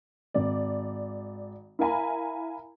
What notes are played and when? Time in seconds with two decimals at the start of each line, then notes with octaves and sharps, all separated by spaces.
0.34 G#1 D5
1.79 E4 A#4 F5 G#5 A#5 B5